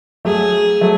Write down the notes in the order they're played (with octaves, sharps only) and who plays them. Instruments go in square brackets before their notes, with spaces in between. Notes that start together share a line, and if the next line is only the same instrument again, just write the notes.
[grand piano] F#3 A3 [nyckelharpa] G#4
[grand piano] F#3 A3